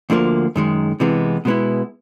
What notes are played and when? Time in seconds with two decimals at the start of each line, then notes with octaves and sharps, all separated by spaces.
0.10 D2 D3 F3 A#3
0.56 F#2 D#3 G#3
1.00 C3 E3 G#3 B3
1.45 B2 G#3 B3 E4